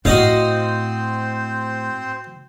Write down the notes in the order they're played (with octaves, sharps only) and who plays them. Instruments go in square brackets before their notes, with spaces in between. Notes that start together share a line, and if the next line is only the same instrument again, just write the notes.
[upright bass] A2 [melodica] C4 C5 [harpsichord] F#4 D#5 F5